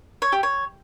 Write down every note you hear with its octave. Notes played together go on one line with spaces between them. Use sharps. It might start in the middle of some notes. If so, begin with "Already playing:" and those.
C#5
G4
C#5